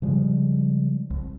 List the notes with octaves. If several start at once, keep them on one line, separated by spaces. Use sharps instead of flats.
C#3 F3 G3 G#3
C2